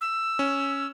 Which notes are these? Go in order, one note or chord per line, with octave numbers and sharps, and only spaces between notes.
E6
C#4